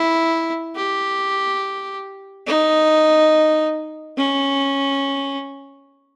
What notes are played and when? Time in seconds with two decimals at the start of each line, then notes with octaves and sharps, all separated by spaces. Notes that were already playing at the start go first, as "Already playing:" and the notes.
Already playing: E4
0.76 G4
2.47 D#4
4.17 C#4